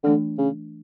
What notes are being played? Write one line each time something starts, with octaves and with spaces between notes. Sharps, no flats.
D3 E3 A3 D4
C#3